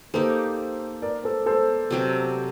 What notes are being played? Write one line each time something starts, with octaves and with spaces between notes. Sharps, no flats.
A#3 D#4 G4 A4 C5
A#4 D5
A4 C5
A4 C5
C3 F#3 C4 G4